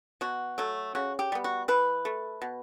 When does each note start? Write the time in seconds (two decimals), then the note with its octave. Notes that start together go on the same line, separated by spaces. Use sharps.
0.21 B2 F#4
0.58 F#3 A3
0.95 C#3 F#4
1.19 G4
1.32 G3 B3
1.44 F#4
1.68 E3 B4
2.05 A3
2.42 B2